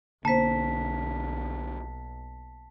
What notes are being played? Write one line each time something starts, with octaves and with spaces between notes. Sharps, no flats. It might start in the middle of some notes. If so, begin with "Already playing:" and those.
B1 B2 D3 A#3 C5 A5 B6